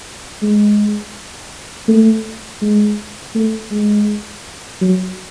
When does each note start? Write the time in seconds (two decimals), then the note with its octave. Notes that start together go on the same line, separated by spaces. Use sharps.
0.42 G#3
1.88 A3
2.62 G#3
3.35 A3
3.71 G#3
4.81 F#3